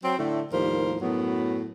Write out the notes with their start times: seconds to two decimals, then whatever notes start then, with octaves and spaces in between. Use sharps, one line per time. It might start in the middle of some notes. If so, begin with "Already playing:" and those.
0.03 F#3 C4
0.18 A2 D3 A3
0.52 D#2 A2 F3 G3 A#4 C5
1.01 F#2 A2 F#3 B3